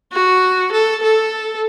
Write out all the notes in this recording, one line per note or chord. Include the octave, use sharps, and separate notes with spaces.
F#4
A4
A4